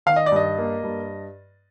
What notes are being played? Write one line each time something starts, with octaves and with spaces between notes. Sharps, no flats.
D#3 F5
D#5
D5
G2 D#5
A#3
G2